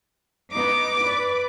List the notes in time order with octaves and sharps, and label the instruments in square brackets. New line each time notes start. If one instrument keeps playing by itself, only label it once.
[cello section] B3 D#4 [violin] D6
[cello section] B4 D5